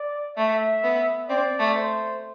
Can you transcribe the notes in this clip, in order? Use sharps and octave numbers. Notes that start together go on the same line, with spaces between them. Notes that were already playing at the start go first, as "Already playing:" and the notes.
Already playing: D5
A3 E5
B3
C4 D5
A3
C5